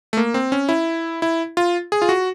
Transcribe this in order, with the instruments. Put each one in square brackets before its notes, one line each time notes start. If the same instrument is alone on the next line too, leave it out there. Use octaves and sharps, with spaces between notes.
[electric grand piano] A3
A#3
C4
C#4
E4
E4
F4
G#4
F4
F#4